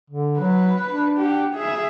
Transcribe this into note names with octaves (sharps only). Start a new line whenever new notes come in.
D3
F#3 B4
D4
G4 F#5
G#4 E5